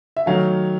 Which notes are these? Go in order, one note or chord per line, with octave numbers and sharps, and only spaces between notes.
E5
D#3 F#3 A3 F5